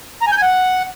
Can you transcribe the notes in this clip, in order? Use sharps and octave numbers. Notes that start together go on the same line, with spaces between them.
A#5
G#5
G6
G#5
F#5